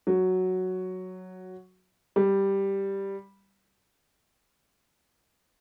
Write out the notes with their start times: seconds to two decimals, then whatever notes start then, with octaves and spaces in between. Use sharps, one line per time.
0.07 F#3
2.16 G3